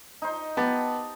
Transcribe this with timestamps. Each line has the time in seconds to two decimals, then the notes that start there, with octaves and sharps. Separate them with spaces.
0.22 D#4 C5
0.57 B3 G4 A5